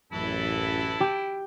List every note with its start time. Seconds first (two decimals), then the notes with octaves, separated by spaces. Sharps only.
0.12 A1 F#2 E3 E4 A4 A5
1.00 G4